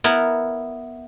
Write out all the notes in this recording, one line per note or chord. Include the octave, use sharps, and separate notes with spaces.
B3 E4 A#4